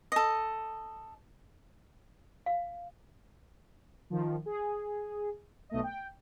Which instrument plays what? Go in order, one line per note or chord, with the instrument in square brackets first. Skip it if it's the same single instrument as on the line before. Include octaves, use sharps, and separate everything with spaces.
[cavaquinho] A4 D#5
[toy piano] F5
[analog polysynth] D#3 F3
G#4
B1 A3 D#5
G5